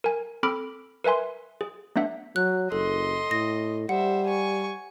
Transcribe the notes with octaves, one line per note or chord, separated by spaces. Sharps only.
A#4 G#5
C4 A4 B5 D6 F6 D7
A#4 B4 E5 G#5 C6
G#4
A3 B3 D4 E5 F#5
F#3 F#6
F#1 A4 D#5 C6
A2 A#6
G3 C5 E5 F#5
G#5 C#6